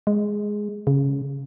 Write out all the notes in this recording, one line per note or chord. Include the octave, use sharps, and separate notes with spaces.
G#3
C#3